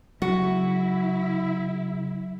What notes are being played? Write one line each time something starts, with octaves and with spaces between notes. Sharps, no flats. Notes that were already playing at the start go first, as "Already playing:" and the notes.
C#3 F#3 E4 F#4